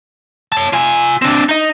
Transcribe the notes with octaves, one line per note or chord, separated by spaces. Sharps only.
C#5 A5
F4 G#5
C4 D4
D#4 D#5